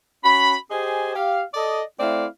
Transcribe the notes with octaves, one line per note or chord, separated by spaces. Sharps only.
C#4 F#4 B5
G4 G#4 C5 D#5 G#5
G4 F5
A4 D5 D#5
A3 C4 E4 D5 F5